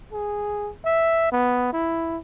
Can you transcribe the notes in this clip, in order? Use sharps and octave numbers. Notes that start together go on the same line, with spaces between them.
G#4
E5
B3
E4